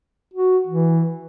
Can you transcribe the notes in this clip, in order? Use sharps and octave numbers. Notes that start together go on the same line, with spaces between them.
F#4
E3